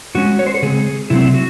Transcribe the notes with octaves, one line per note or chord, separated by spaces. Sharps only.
A2 G#3 C#4 F#4
C#5
C5
A4
C#3 G#3 C4 G#4
C3 F#3 A3 C4 E4
F#4